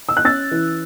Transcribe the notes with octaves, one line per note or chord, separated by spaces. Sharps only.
E6
F#6
C#4 E6 A6
E3